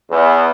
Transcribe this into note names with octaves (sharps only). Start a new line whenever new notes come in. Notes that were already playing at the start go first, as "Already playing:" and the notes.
E2